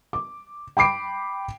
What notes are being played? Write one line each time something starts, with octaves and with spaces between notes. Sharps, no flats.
D6
G5 B5 D6 C7 D7